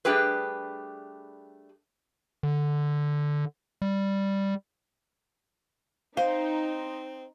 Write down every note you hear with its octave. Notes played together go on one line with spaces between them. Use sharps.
G3 A3 D4 G4 G#4 B4
D3
G3
C4 D#4 C5 F5